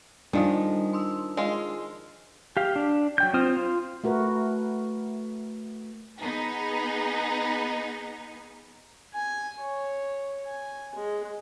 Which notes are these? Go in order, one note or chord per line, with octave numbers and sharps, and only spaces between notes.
D#3 F3 G3 D4 D#6
C6 D#6 E6
G#3 F4
G4 F5
D4
F#3 G5 G6
C4 F4 C5 D#6 F6
F4
A3 F#4 A#4 B4
B3 D#4 G#4
G#5
C#5
G#5
G#3